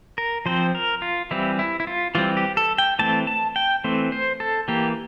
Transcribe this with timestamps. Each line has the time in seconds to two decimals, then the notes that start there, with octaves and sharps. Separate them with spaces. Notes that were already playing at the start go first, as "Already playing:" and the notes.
0.18 A#4
0.46 F3 C4 C5
0.75 A#4
1.02 F4
1.31 E3 G3 C4 E4
1.59 E4
1.80 E4
1.87 F4
2.15 E3 G3 C4 F4
2.37 G4
2.57 A4
2.78 G5
2.99 E3 A3 C4 A5
3.27 A5
3.56 G5
3.84 E3 A3 C4
4.12 C5
4.40 A4
4.68 E3 A#3 G4